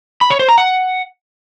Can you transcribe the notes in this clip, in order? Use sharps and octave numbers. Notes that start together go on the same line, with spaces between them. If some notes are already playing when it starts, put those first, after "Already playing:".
B5
C#5
C5
A#5
F#5